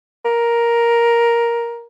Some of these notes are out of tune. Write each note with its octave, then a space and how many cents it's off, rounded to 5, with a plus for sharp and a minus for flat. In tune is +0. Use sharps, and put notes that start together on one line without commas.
A#4 +10